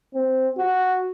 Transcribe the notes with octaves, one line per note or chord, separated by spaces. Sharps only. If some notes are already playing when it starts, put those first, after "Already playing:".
C4
F#4